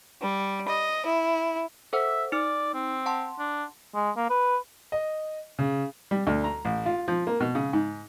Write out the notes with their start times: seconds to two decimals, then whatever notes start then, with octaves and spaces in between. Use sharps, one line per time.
0.22 G3
0.68 D#5
1.06 E4
1.93 A4 C5 E5 F#5
2.32 D#4 D5 F6
2.74 C4
3.06 F#5 A5 C6
3.39 D4
3.95 G#3
4.17 A#3
4.30 B4
4.92 D#5
5.59 C#3
6.11 G3
6.27 D2
6.44 A#5
6.65 A1
6.86 F4
7.08 F3
7.27 A#3
7.40 B2
7.55 C#3
7.73 G#2